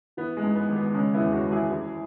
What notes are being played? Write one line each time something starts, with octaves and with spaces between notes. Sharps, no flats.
E3 B3
G#3
G#2
B3
G#1
B3
C#3 G#3 C#4
B3 E4
E2
C#4 F#4
E1
E4 G#4
E3